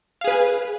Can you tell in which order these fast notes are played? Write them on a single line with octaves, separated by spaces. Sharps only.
F5 G#4 B4 G#5